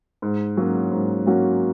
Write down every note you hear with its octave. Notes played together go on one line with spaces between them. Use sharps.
G#2
F#3 A#3 C#4 F#4
G#2
F#3 A#3 C#4 F#4